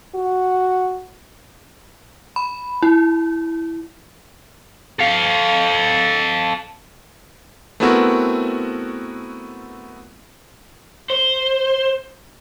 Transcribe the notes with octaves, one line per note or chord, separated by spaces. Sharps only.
F#4
B5
E4
A4 F5
A3 B3 C4 E4 F#4 A#4
C5